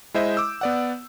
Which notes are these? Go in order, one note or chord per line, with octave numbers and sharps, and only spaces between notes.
G#3 E4 C5 D#5 E5 G6
D6 E6
B3 D5 F#5